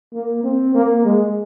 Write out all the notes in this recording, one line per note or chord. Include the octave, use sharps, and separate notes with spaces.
A#3
C4
A#3
G#3